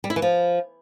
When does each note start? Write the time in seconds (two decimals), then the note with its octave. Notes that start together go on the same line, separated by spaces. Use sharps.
0.04 G3
0.10 E4
0.16 E3
0.22 F3